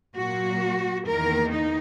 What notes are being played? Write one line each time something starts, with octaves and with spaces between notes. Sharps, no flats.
A#2 F#3 A#3 F#4
E2 D#3 A#3 A#4
D#4